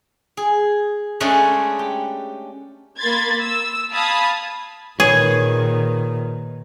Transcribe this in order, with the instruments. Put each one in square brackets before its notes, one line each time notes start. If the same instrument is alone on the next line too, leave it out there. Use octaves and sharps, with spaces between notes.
[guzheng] G#4
G#3 A3 C#4 D4 G#4 B4
G4
[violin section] A#3 B5 C6 G#6 A6
E6
F5 A5 B5 D#6 G#6
[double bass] A#2 D#3 [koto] G#4 [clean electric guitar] B4 C#5